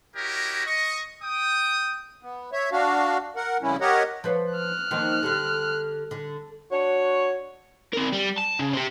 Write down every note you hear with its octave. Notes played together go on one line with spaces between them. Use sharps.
E4 F#4 G4 A#4 C#5 D#5
D#5 C#6
G5 D#6
B3
C#5 E5
D4 F#4 F5
A#4 F#5
F2 C#3 G3 C#4 E4
G4 A#4 C#5 D#5 F#5
F3 B4 C#5
F6 F#6
D#3 F3 A#3
D3 G3 A4
D3
D4 F#4 C#5
C4 A#4
G3
A5
C#3
C4 G4